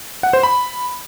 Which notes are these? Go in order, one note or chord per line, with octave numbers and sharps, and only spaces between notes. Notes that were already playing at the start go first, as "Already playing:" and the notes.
F#5
C5
B5